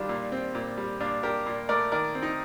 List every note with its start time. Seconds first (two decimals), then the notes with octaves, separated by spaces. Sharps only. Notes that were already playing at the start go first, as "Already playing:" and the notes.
Already playing: D#3 G3 D4 F4
0.09 A#2
0.32 C4
0.55 A#2
0.78 G3
1.00 A#2 D4 F4
1.23 D4 G4 A#4
1.46 A#2
1.69 A3 A#4 D5
1.92 D#3 A#4 D5
2.15 C4
2.23 D#4